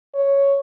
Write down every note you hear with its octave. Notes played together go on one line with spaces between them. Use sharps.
C#5